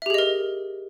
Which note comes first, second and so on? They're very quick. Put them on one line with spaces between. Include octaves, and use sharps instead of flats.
E5 G4 G#4 D#5 A#4